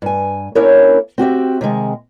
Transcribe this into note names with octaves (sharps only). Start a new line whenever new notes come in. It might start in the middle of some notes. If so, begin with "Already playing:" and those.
G2 G#5
A#3 C#4 D4 E4 A#4 C#5
C4 F#4 G4 E5
C3 D#3 G#3 G#4